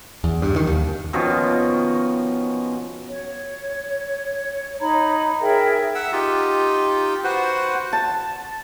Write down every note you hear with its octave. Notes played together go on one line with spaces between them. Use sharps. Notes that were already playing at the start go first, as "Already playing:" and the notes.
E2
G2
D#3
D#2
B2 D#3 F3 C#4
C#5
D#4 C#5 A#5 B5
G#4 A#4 E5 G5
E5 F#5 E6
D#4 F4 G4
F#4 B4 C5 F#5
A5